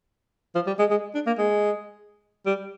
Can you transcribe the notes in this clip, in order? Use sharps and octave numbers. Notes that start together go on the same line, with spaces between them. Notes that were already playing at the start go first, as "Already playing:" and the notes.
F3
G3
G#3
G#3
D4
A#3
G#3
G3